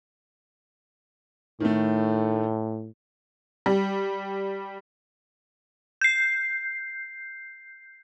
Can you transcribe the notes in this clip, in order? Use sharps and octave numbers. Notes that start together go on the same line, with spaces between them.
A2 D#3 A3
G3
G6 C7